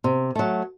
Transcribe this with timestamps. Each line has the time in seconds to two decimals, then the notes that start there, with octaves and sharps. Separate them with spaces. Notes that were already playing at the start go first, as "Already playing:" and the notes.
0.04 C3
0.35 F#3 A3